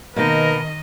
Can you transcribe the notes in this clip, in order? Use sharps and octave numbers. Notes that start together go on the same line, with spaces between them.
B2 D#3 A#3 B3 D#4 A#4 B4 D#5